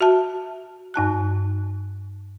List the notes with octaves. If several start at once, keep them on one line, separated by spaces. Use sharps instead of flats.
F#4 E5 A5
G2 D#4 A5 F#6